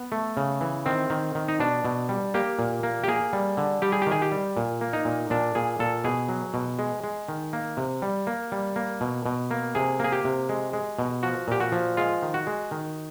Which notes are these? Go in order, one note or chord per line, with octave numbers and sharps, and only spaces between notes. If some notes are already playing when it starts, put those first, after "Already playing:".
Already playing: B3
A3
C#3
E3
D#3 C4
D#3
D#3
D#4
B2 D4
B2
G3
A#3 G4
A#2
A#3
G4
A#3 G#4
G3
D3
G3 G4
G#4
G4
D#3 G#4
G4
G3
A#2
A#3
D#4
A#2
A#2 D4
A#2 G#4
A#2 A4
B2 G#4
F#3
B2
G#3
G#3
D#3
A#3
C3
G3
A#3
G3
A#3
B2
B2
A#3
C3 G#4
A#3 G#4
G4
C3
G#3
G#3
B2
F3 F#4
A#2 G4
F#4
F3
G#3 F4
D#3
F#4
G#3
D#3